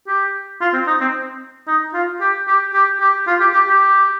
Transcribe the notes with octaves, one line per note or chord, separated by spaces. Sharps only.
G4
F4
C4
D#4
C4
D#4
F4
G4
G4
G4
G4
F4
G4
G4
G4